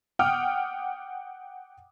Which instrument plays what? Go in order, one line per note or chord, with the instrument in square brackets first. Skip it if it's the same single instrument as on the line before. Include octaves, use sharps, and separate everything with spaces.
[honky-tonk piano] F#5 G5 D6 D#6 F6